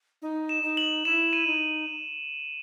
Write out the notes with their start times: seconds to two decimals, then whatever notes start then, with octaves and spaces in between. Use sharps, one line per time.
0.22 D#4
0.49 E7
0.63 D#4
0.77 F#7
1.05 E4 E7
1.33 D#7
1.47 D#4